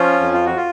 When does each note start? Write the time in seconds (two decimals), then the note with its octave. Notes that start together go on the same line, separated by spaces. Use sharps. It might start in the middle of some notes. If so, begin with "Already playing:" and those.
Already playing: F3 C#4 F4
0.20 F2
0.33 F4
0.46 F#4
0.57 F4